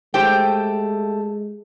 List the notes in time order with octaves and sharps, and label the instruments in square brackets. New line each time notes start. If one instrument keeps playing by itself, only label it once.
[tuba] G#3 [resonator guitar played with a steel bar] A3 G4 C5 [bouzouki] G5